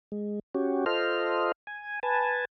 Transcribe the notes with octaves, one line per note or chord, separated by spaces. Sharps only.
G#3
C#4 F#4 G4
F4 A4 C5 D#5 F6
G#5
B4 G#5 A5